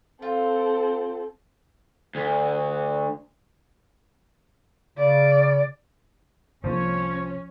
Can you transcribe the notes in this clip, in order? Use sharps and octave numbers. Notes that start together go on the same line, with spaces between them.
C4 F4 A4 G5
D2
C#3 D5
C2 C3 F3 A#3 C#4 C#5